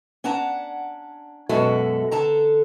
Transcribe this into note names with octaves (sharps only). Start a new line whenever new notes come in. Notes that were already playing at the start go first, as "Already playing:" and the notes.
C#4 D4 F#5 A5 A#5
F#2 B2 G#3 F#4 A4 E5
D3 A4 A5 A#5